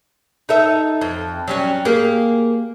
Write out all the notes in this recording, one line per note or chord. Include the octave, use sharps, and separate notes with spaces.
D#4 A4 E5
F2
F#3 G3 C#4
A#3 G4 G#4